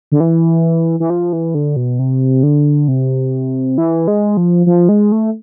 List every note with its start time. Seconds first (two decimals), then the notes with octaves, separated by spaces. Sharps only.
0.12 D3
0.20 E3
1.00 E3
1.10 F3
1.33 E3
1.55 D3
1.76 B2
1.99 C3
2.43 D3
2.88 C3
3.78 E3
4.08 G#3
4.37 F3
4.66 F3
4.89 G#3
5.12 A3